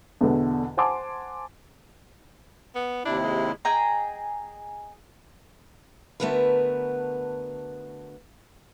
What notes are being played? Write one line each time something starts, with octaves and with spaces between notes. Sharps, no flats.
E2 B2 D3
C5 F#5 G#5 A5 C6 D6
B3
D#2 C3 D4 E4
G#3
G#4 D#5 G5 A#5
D3 A3 B3 F#4 A#4 B4